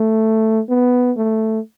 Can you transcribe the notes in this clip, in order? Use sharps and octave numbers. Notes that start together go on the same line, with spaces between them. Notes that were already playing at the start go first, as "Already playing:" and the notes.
Already playing: A3
B3
A3